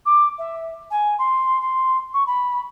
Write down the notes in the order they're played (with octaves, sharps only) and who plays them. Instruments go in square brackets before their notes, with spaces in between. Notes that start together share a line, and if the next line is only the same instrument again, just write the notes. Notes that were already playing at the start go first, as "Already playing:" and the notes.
[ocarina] D6
E5
G#5
C6
C6
C#6
B5